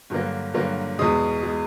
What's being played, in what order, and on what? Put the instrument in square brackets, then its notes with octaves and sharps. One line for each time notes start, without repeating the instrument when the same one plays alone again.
[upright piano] G2 D3 F#3 A#3
G2 D3 F#3 A#3
E2 B2 G#3 D#6
B2 G#3